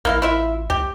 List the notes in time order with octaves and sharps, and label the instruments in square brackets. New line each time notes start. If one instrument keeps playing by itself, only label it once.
[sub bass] A1 [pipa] A#3 E4 F5
[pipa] E4 F4 E5
[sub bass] C#2 [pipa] G4